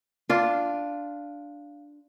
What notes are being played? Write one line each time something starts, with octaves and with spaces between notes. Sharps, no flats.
D4 F4